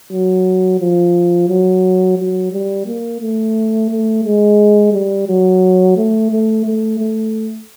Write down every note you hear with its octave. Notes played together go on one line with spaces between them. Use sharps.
F#3
F3
F#3
F#3
G3
A#3
A3
A3
G#3
G3
F#3
A3
A3
A3
A3